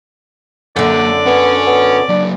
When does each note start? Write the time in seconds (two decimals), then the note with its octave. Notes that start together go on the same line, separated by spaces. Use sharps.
0.76 F#2 D3 A#3 A4 D5
1.26 B3 C#4 C#5
1.67 B3
2.09 F#3 A#3 D4